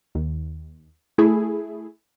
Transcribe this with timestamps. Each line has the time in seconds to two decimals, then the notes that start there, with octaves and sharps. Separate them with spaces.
0.15 D#2
1.18 A3 E4 G#4